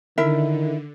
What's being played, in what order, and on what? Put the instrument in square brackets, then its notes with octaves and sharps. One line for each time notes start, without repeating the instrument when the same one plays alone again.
[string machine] D3 [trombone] D#3 [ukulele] E4 A#4 E5